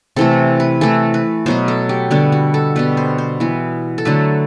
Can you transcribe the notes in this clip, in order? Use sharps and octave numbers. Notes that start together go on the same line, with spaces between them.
C3 E3 A3 A4
B4
E3 A3 A4
B4
B2 F#3 B3 C5
A4
G4
D3 G3 B3 F#4
F#4
A4
B2 G3 B3 B4
C5
C5
E3 B3
A4
D3 F#3 A3 B4